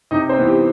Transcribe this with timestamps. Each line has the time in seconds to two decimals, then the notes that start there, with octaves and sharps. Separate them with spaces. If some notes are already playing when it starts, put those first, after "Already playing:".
0.11 C3 D#4 D#5
0.29 C4 C5
0.38 E3 B3
0.47 G4